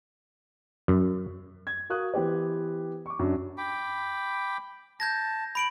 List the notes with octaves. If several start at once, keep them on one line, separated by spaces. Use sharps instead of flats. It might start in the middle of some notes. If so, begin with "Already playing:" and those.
F#2
G#6
F#4 A#4 F5 D#6 F#6
E3 B3 G4 C5
C#6 D6
F#2 D4
G5 B5 D6
A5 G6 G#6 A#6
B5 D7 F#7